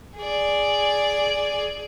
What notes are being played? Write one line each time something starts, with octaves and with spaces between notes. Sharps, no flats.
G#4 D5